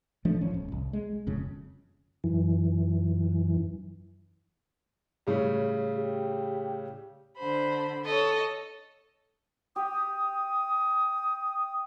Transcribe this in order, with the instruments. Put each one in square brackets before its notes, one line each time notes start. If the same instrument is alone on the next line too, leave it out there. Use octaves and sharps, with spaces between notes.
[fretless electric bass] E3 F3 A3 D4
G#1 F3 C#4
D1
C2
G#3
D#1 F2 C#3
[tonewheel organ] F#2 E3
[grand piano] A2 C#3 G3
[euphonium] G4
[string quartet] D3 C5 B5
[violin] A4 C#5 [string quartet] D#5
[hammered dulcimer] G4 [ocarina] D#6